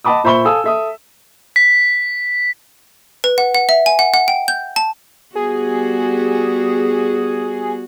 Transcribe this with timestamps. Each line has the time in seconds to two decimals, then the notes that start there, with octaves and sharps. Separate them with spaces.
0.04 D#5 F#5 A5 B5 D6 D#6
0.24 A#2 C5 E5 B5 C#6 G7
0.45 A4 F5 G#5 D#6 E6
0.64 A4 E5 D#6
1.56 B6
3.24 B4
3.38 F#5
3.55 F#5
3.69 E5
3.86 G#5
3.99 F#5
4.14 F#5
4.28 G5
4.48 G6
4.76 A5
5.35 G3 B3 F#4 G#4